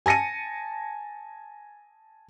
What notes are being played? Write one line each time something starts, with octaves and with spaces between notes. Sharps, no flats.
G#5 A5 A#6 C#7 D#7